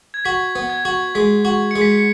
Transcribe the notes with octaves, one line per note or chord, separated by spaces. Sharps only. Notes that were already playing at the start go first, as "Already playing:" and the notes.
G#6
F#4 B6
B3
G#6
F#4
G#3 B6
F#4
G#3 C#7
B6
C#7